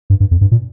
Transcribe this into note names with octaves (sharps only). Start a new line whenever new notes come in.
G2
G2
F2
G2
A#2